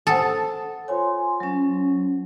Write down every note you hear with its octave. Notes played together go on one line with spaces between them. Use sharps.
A4 C5 F#5 D#6
F4 C5 C#5 G#5 C6
F#3 C#4